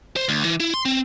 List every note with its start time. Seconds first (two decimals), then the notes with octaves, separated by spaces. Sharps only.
0.16 C5
0.29 D2
0.45 E3
0.60 E4
0.74 C6
0.85 C4